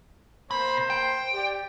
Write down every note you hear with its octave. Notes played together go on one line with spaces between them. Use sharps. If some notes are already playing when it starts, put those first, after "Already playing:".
B2 A#3 C5 B5
G5
G4 D5